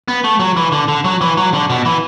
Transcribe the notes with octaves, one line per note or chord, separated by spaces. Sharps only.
B3
A3
F#3
E3
D3
D3
F#3
E3
F#3
D3
B2
E3